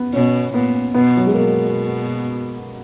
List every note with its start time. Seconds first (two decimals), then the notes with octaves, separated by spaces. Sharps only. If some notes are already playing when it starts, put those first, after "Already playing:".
Already playing: B3
0.13 B2 C#4
0.53 A#2 B3
0.94 B2 B3
1.17 F#3
1.27 G#3
1.34 B2 A#3